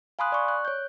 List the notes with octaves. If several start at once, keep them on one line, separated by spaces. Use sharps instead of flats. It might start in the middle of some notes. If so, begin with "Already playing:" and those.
F5 G#5 B5 C6 D#6 F#6
D5 C#6
F#6
C#5 G6